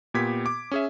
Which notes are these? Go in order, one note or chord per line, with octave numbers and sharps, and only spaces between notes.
A#2 B3 G4 G#6 B6
D6
C#4 G#4 E5